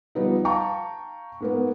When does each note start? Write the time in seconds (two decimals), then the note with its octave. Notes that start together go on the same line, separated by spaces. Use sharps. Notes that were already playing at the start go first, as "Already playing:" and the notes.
0.15 F3 G3 B3 D#4
0.45 F5 G5 A5 A#5 C#6
1.40 G#2 A#3 B3